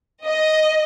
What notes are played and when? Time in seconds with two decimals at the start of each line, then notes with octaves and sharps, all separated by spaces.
0.24 D#5